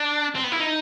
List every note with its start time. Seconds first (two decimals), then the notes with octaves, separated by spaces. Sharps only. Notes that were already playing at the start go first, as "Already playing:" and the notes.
Already playing: D4
0.35 C4
0.44 B3
0.52 E4
0.60 D#4